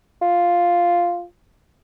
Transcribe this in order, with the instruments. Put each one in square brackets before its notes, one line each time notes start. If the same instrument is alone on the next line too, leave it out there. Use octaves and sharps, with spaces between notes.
[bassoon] F4